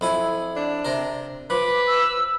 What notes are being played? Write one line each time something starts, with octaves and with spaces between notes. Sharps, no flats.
F2 E4 G#5
D4
C3 A#4
F3 B4 D6
E6